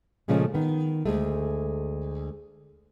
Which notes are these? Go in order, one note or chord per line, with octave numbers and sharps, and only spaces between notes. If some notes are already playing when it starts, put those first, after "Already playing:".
A#2 C#3 F3 G#3 A3 C#4
D#3 B3
D2 G#3 A3